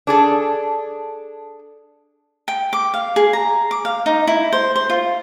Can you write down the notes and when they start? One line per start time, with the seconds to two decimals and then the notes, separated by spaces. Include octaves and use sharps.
0.07 D4 G#4 A4
2.48 G5
2.73 D6
2.94 F5
3.16 G#4
3.33 A#5
3.71 D6
3.85 F5
4.06 D#4
4.27 E4
4.53 C5
4.76 C5
4.90 F4